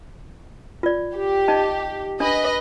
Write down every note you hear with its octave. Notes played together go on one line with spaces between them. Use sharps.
F4 D5
G4
D#4 D#5 A5
D4 B4 D#5